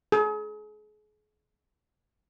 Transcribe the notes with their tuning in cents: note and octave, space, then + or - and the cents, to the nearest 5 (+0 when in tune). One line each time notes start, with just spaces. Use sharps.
G#4 +35